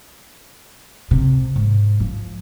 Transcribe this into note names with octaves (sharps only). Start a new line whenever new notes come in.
C3
G#2
F3